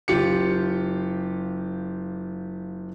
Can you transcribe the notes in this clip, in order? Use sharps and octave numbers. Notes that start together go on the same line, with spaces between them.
F#1 F4 G4 C#7